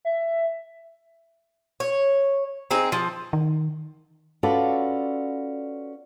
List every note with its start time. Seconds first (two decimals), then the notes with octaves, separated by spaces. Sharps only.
0.05 E5
1.80 C#5
2.71 C4 D#4 G#4
2.92 F3
3.33 D#3
4.43 C#4 F4 F#4 A4 B4 D5